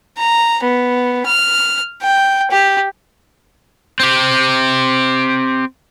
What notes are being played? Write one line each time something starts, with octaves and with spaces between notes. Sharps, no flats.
A#5
B3
F6
G5
G4
C4 G4